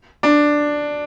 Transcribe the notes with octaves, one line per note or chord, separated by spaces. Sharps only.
D4